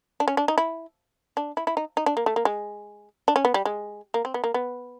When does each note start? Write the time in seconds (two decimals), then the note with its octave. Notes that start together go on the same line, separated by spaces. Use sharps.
0.20 D4
0.28 C#4
0.37 D4
0.48 D#4
0.58 E4
1.37 D4
1.57 E4
1.67 E4
1.77 D#4
1.97 D#4
2.06 D4
2.17 A#3
2.26 A3
2.36 A#3
2.45 G#3
3.28 D4
3.36 C#4
3.45 B3
3.54 G3
3.65 G#3
4.14 A#3
4.25 C4
4.34 B3
4.44 A#3
4.54 B3